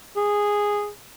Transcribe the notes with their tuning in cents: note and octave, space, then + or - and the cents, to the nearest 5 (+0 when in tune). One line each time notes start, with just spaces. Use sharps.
G#4 -10